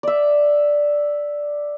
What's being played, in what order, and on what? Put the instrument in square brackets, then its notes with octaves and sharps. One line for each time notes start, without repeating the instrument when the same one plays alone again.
[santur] D5 E5